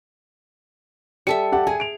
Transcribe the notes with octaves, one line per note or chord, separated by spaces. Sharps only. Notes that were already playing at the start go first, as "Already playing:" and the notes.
G3 A4 E5 C#7
G4 F#5 A5
G#4 G#5
D7 F7